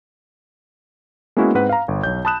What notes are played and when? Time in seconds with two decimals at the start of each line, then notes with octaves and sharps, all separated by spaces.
1.37 G#3 A#3 B3 C#4 E4 F#4
1.55 G#2 C4 B4 F#5
1.69 F5 A#5
1.88 G1
2.03 B1 C#5 G6
2.25 A5 B5 D#6 F#6 E7